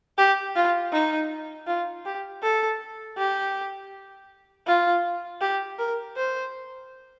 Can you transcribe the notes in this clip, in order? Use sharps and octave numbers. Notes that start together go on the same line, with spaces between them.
G4
F4
D#4
F4
G4
A4
G4
F4
G4
A#4
C5